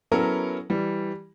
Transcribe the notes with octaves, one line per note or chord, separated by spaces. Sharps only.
F#3 B3 C#4 E4 A4 A#4
E3 G3